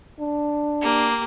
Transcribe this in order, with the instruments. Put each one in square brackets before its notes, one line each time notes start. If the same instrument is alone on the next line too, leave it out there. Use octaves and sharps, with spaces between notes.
[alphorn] D4
[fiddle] A#3 G4